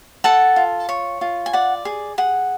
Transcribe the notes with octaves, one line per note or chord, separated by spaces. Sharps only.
A4 F#5 A5
F4
C#5
F4
G#5
D5 F#5
G#4
G#4 F#5